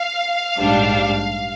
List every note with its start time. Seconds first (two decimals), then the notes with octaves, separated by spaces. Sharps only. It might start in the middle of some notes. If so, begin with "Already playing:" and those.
Already playing: F5
0.58 A#1 G#2 G3 D4